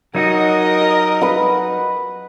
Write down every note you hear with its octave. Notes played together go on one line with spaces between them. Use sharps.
F#3 D#4 F#4 A#4 D#5
B4 F#5